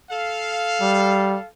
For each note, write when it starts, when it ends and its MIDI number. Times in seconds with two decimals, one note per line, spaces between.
0.10 1.45 69
0.10 1.45 77
0.81 1.38 55